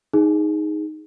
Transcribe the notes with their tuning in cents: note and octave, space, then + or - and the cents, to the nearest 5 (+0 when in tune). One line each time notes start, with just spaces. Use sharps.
D#4 +0 G#4 +0